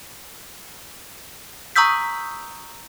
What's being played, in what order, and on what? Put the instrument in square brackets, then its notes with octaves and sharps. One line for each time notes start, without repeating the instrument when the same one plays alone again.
[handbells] A#5 C#6 D#6 E6 G6 B6